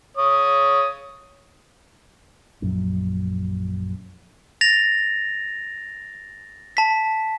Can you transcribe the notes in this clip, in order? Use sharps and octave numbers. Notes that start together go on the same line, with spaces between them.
C#5 D#6
A#1 F#2
A6 A#6 F7
A5 B6